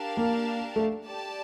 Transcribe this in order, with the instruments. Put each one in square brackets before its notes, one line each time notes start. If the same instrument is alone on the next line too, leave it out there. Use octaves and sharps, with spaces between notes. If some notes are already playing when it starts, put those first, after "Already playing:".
Already playing: [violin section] D4 G4 A#4 F5 A5
[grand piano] A#3
A3
[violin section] G4 D5 A5